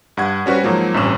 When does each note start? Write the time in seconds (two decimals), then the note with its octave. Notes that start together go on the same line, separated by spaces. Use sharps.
0.17 G2 F#5 G#6
0.46 G3 C#4 F#4 B4 C5
0.63 G#2 F3 F#3 A#3
0.94 A1 G2 C3 C#4 E7